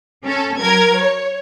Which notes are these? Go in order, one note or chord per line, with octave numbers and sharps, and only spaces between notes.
C#4 A4
F#3 A#4 G#6
C#5